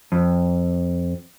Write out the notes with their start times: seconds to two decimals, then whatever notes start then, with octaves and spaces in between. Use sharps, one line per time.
0.12 F2